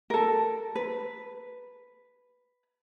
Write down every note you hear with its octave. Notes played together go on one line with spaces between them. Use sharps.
A4 A#4
B4